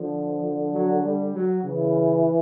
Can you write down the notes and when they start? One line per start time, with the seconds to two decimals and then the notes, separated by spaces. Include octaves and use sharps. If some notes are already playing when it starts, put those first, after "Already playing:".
Already playing: D3 F3
0.43 F3
0.73 F#3
1.03 G3
1.34 F#3
1.63 C#3 E3